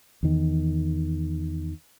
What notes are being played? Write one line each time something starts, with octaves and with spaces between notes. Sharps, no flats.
E2 D#3